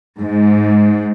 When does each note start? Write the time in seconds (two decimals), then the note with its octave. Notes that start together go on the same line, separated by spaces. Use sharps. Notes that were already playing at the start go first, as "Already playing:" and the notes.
0.19 G#2